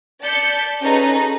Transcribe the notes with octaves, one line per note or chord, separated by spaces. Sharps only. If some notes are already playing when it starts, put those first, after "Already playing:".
D5 A5 G6 B6 C#7
C#4 D#4 F#4 G#4 A4 B4